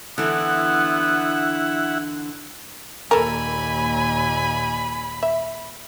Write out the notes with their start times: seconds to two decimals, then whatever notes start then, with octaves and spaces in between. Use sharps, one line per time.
0.18 D3 E3 B3 E4 F#5
3.11 D#2 A#2 A4 A#4 G#5 B5
5.23 E5